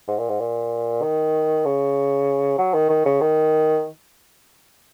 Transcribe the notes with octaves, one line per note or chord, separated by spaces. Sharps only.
G#2
A#2
G#2
A#2
D#3
C#3
F#3
D#3
D#3
C#3
D#3